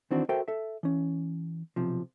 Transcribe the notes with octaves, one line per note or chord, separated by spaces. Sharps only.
D#3 E3 C4 D4 F#4
F#4 A4 A#4 C5 E5 G5
A4 E5
E3 C#4
B1 C3 F3